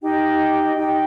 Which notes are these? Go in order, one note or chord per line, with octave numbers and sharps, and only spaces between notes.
D#4 G4 D#5 G5
D#4 G4 D#5 G5